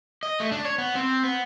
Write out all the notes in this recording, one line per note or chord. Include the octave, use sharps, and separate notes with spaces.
D#5
A3
D4
C#5
B3
C4
B3